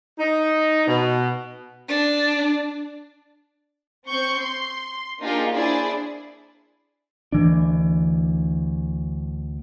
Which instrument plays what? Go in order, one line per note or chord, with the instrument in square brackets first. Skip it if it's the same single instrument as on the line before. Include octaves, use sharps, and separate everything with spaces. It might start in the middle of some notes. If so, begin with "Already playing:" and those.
[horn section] D#4
B2
[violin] D4
[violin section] C4 C#6 G6
C6
A#3 D4 D#4 F4 G4 G#4
D4 E4 G#4 C5 D5
[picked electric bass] D2 E3 D4